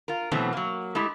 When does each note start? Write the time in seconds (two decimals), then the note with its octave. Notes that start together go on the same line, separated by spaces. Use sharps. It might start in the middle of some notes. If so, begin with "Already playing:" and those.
0.08 F4 A#4
0.31 B2 E3 F#3 A3 C4
0.53 F#3 A#3
0.95 G#3 A3 E4 G4